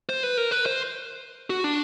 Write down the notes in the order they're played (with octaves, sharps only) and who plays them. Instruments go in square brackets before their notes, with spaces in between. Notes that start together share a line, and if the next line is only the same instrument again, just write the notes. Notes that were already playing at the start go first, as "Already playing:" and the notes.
[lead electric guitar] C5
B4
A#4
B4
C5
F#4
D4